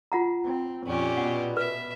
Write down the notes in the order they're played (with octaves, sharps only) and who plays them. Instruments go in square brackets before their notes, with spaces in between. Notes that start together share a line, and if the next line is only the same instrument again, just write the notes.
[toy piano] F4 F#5 A#5
[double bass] C4
[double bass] F2 [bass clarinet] A#2 [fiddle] C#4 G4
[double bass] B2 B3 [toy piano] F#5
[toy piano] B4 [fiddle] E5